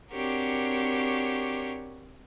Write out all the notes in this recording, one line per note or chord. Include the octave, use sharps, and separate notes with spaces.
C4 D4 F#4 G4 A#4 C#5